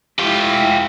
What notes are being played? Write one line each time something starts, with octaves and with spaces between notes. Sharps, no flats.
G#3 E4 F4 G4